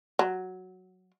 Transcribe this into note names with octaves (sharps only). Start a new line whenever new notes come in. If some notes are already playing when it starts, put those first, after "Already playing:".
F#3